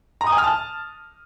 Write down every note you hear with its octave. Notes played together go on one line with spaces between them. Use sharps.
A#5
D#6
G#5
F6
A5